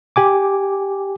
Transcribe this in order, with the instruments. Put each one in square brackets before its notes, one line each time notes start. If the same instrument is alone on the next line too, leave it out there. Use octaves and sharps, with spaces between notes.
[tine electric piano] G4 G#5 D6